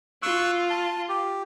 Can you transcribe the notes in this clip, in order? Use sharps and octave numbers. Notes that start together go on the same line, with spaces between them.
F4 C#6 E6 F#6
A5
G4